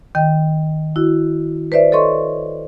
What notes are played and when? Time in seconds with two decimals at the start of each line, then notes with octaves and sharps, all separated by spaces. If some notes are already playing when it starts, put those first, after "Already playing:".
0.15 D#3 D#5 G5
0.96 E4 F#4
1.72 B4 C5 D5 E5
1.92 A4 C#5 D#5 C6 C#6